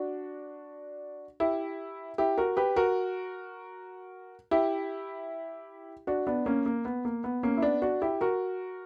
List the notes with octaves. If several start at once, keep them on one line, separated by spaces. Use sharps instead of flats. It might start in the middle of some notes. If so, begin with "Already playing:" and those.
Already playing: D4 F#4
E4 G4
E4 G4
F#4 A#4
G4 B4
F#4 A#4
E4 G4
D4 F#4
B3 D4
A#3 C#4
A#3
B3
A#3
B3
A#3 C#4
E4
B3 D4
D4 F#4
E4 G4
F#4 A#4